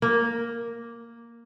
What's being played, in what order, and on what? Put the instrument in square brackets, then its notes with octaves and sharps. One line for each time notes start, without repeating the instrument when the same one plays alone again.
[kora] A#3